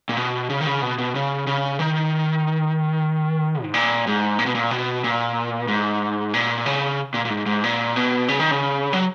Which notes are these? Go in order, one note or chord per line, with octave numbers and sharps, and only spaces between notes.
A#2
B2
C#3
D#3
C#3
B2
B2
C#3
C#3
D#3
G#2
A#2
G#2
A#2
B2
A#2
B2
A#2
G#2
A#2
C#3
A#2
A#2
G#2
G#2
A#2
B2
C#3
D#3
C#3
F#3